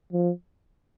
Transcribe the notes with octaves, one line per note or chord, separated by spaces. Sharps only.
F3